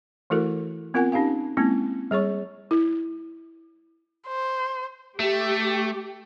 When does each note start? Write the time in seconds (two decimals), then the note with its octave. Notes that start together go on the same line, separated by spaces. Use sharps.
0.30 E3 A3 E4 F#4 A4 A#4
0.94 B3 C4 F4 A#4 F#5 G#5
1.12 C#4 D#4 G4 F5 G#5
1.57 G#3 A#3 C4 C#4 E4
2.11 G3 G#4 C#5 C#6
2.71 E4
4.27 C5
5.20 A3 G4